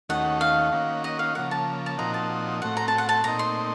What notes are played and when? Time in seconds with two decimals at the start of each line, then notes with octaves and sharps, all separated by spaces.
0.09 D#2 D#3 A3 C#4 F#4 F#5
0.41 F5
0.72 D#3 A#3 C#4 F#4
1.04 D#5
1.19 F5
1.35 C#3 F3 A#3 F#5
1.51 A5
1.86 A5
1.98 A#2 F3 C4 D#4 F#4 A#5
2.14 A5
2.61 A2 A3 C4 F#4 F#5
2.77 A#5
2.88 A5
2.98 F#5
3.09 A5
3.24 A#2 A3 C4 D#4 A#5
3.39 C6